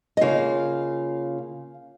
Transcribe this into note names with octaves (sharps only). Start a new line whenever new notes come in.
D#5
C#3 A#3 F4 F5